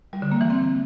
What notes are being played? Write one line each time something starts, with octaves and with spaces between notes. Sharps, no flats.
G3
D3
A#3
E3
C4